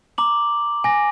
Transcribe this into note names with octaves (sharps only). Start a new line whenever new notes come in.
A#5 D6 F#7
G#5 A#6